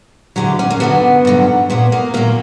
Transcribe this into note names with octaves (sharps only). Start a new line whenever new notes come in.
E2 D3 F#3 G4
C#4
A#3
G2 D3 F#3 B3
G2 D3 F#3
A#2 F#3 B3
A#3
A#2 F#3 A#3